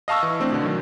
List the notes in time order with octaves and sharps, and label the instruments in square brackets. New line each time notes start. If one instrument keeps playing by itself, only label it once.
[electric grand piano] D#5 F5 A5 C#6 E6
E3
A3 C4 D4
B2 D3
D#3 F#3